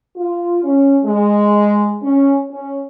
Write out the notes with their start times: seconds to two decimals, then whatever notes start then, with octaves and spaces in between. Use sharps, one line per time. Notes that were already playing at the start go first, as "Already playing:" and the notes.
0.17 F4
0.64 C#4
1.04 G#3
2.02 C#4
2.51 C#4